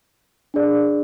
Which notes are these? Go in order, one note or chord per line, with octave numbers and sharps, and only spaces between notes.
D4 G#4 D5